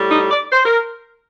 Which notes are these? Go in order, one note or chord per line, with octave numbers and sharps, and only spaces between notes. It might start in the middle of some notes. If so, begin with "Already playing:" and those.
Already playing: A2 G3
D#4
D5
C5
A#4